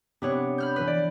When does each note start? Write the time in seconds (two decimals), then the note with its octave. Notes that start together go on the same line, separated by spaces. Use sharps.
0.22 C3 B3 D4 C#5
0.58 B5 F6 G6
0.76 E3 B4
0.88 D5